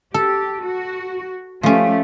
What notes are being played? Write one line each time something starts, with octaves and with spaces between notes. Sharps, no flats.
G4 A4
F#4
F3 A3 C#4 G4